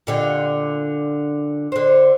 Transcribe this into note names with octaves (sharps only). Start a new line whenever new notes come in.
A#2 D3 G3
D3 C5